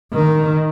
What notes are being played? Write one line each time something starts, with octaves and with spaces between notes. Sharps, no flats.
D#3